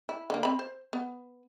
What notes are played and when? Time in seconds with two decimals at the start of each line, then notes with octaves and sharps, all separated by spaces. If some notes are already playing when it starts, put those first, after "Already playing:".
0.09 E4
0.30 D3 A#3
0.43 C4 B5
0.59 C5
0.93 B3